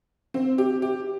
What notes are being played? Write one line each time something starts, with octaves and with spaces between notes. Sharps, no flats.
C4
G4
G4